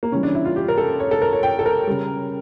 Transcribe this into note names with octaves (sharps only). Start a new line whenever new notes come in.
A#3
C#3 E3 G3 C#4
D4
E4
F4
G4
A#4
A4
C#5
A4
A#4
C#5
G5
A4
A#4
C#3 G3